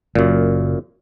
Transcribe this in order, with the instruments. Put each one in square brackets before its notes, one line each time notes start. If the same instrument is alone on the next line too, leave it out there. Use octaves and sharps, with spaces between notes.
[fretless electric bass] F#1 [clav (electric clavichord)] F#2 A#2